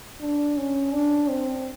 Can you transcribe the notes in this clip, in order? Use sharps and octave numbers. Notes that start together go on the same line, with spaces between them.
D4
C#4
D4
C4